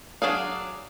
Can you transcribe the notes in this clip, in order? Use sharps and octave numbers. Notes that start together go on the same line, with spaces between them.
F#3 D4 G#4 F5